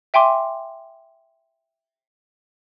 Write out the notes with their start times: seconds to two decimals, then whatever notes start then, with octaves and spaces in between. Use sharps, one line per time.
0.14 E5 G5 G#5 C6 D6